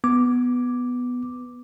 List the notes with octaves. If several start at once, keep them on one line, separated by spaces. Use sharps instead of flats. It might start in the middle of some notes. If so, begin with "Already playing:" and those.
B3 D6